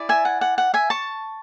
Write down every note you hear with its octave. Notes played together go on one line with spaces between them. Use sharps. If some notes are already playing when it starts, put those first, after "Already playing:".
Already playing: E4 G#4 D5
E5 G#5
F#5
F#5
F#5
E5 G#5
A5 C#6